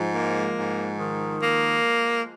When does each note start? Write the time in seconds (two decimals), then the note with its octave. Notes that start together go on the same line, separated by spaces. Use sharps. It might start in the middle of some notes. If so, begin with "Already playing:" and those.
Already playing: G#2 F3 G#3
0.15 A#3
0.58 G#2
0.99 D#3
1.43 A#3